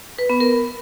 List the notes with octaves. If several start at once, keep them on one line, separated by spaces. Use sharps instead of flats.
B4
B3
A#4